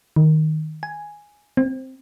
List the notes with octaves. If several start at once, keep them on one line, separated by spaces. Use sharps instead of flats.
D#3
G#5
C4